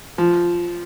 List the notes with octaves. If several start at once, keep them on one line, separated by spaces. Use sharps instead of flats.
F3